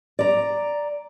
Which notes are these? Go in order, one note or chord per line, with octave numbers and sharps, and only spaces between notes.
D5 A#5